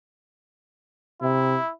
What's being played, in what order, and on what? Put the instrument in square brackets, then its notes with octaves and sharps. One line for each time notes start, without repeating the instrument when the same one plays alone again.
[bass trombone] C3 [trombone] E4